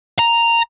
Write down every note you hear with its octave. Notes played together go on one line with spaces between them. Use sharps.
A#5